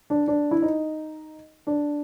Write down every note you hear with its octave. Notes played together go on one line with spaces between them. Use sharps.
D4
D4
E4
D#4
D4